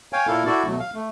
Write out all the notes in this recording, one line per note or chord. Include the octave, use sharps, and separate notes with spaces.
C#5 F5 G5 G#5
A#2 A#3 E4 A4 F5
D4 E4 F#4 A4 D5
B2 F#3 A3
F5
A3